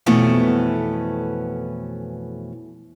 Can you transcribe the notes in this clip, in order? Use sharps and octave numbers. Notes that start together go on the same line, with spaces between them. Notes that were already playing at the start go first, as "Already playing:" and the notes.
F2 B2 E3 A3 B3 C#4